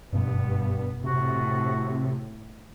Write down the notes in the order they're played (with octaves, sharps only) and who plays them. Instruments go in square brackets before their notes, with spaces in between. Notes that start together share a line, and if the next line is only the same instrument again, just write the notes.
[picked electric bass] F#1 B2 [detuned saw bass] G2 [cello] B3
[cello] A2 [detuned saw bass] C3 [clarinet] F#4